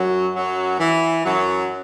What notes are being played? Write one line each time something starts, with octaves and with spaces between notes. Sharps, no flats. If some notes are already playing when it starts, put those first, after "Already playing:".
Already playing: F#2 F#3
F#2 F#3
E3
F#2 F#3